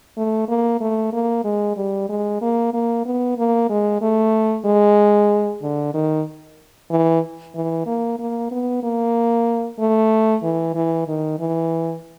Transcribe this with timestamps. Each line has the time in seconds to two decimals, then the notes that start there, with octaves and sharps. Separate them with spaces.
0.17 A3
0.48 A#3
0.81 A3
1.13 A#3
1.44 G#3
1.77 G3
2.09 G#3
2.41 A#3
2.74 A#3
3.05 B3
3.38 A#3
3.69 G#3
4.01 A3
4.65 G#3
5.62 D3
5.94 D#3
6.91 E3
7.55 E3
7.86 A#3
8.19 A#3
8.51 B3
8.83 A#3
9.79 A3
10.43 E3
10.74 E3
11.08 D#3
11.39 E3